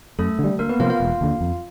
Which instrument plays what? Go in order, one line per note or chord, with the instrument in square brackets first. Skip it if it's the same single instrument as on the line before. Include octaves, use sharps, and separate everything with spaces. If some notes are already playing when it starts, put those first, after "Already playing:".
[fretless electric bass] F#2 [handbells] A3 A4
[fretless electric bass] D3 G3
[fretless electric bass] D2 [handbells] A#3 A#4
[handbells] B3 B4
[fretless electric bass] C3 F3 A#3 [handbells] F4 F5
[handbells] F4 F5
[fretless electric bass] E1
D#2 D3
F2